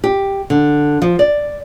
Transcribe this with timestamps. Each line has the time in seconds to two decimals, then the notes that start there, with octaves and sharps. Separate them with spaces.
0.04 G4
0.50 D3
1.02 F3
1.19 D5